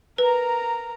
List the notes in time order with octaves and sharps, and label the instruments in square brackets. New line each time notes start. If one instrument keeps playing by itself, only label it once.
[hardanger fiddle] A#4 A#5 [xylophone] B4